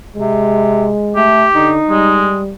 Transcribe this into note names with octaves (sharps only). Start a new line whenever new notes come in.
C3 G#3
A3 G4
D3 D#4
G3 G#3